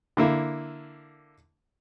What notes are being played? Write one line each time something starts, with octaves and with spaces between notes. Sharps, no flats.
D3 A#3 E4